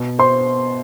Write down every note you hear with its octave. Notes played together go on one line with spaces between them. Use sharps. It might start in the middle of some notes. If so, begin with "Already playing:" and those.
Already playing: B2 B3
C5 C6